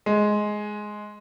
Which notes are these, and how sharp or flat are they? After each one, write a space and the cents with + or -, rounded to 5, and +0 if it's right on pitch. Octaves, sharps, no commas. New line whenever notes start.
G#3 +10